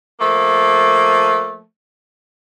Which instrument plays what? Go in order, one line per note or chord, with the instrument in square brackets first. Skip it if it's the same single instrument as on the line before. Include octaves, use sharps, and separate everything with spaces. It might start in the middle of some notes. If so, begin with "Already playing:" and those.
[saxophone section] F3 A3 A#3